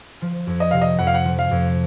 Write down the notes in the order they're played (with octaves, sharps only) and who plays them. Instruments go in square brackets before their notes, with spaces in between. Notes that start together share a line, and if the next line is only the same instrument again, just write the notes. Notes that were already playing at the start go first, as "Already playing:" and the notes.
[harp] F3
F2
[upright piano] D#5
[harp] C3 [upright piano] F5
[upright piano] D#5
[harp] F2 [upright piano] F#5
[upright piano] F5
F#5
[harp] F3
[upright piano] F5
[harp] F2